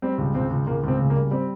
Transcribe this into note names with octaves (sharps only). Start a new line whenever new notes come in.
G3 C4
C#2
C#2 C4
C#2
C#2 A#3
C#2 C4
C#3
A#3
G3
G3 C4